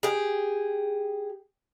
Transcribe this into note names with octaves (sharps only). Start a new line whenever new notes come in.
G4 G#4